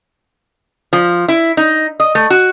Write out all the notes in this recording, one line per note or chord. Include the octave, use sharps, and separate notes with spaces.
F3
E4
D#4
D#5
A3
F#4